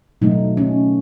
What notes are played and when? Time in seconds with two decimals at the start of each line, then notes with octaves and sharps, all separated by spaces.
0.22 B2 F#3 A3 D#4
0.57 C#4